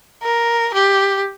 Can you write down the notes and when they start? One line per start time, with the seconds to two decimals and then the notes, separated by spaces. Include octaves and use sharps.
0.23 A#4
0.74 G4